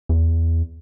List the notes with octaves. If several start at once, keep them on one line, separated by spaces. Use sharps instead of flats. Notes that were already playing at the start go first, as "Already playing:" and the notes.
E2